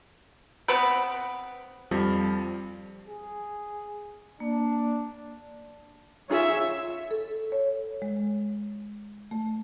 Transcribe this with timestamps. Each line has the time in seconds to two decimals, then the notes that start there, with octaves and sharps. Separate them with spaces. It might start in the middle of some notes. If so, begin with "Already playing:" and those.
0.68 B3 C4 B4 D7
1.91 F2 F3 G3
3.08 G#4
4.40 A#3 D4
6.30 D#4 F4 G#4 C#5 E5
7.11 A4
7.52 C#5
8.02 G#3
9.31 A3